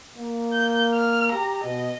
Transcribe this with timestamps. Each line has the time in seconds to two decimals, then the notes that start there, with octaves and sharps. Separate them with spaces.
0.17 A#3
0.53 G6
0.94 F6
1.32 G4 A#5
1.64 B2 D#5